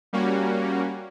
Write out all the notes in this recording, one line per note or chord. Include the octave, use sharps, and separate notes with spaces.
G3 A#3 C#4 F#4